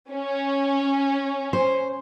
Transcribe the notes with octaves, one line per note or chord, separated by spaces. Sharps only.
C#4
C5